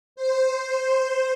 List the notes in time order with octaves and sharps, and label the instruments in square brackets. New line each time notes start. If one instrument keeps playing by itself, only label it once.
[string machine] C5